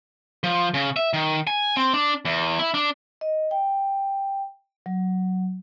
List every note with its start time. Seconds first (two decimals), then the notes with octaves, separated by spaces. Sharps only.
0.44 F3
0.74 C#3
0.96 E5
1.13 D#3
1.47 G#5
1.77 C4
1.94 D4
2.25 E2
2.59 E4
2.74 D4
3.21 D#5
3.51 G5
4.86 F#3